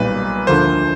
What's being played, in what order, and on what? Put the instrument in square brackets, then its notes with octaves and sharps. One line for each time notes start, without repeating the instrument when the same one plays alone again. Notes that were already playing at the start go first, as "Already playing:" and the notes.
Already playing: [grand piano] B1 A#2 G3 A#3 D#4 [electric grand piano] B4
[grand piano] D2 D3 F3 A#3 [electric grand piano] C5